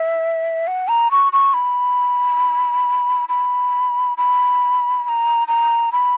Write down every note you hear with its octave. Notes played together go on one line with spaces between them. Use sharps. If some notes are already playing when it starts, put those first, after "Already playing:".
Already playing: E5
F#5
A#5
C#6
C#6
B5
B5
B5
B5
A#5
A#5
B5